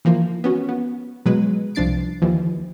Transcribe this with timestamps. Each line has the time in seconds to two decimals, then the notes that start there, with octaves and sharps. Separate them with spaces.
0.05 E3 F3 A#3 F4
0.44 B3 C#4 F#4
0.69 B3
1.26 B2 F#3 G#3 B4
1.75 C2 F3 D4 A6 C7 D7
2.22 D#2 E3 F3